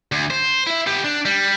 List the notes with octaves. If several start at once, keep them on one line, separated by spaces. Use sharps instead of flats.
D2
C5
E4 E5
B3 G4
D4
G3